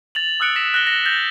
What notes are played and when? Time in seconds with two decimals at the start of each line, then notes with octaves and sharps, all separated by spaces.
0.15 A6 F7 F#7
0.40 D#6 E6 F#6 C#7 D7
0.56 F#6 A#6 B6 C#7 E7
0.74 F#6 A#6 G7
0.87 A#6
1.06 G6 A6 A#6 F7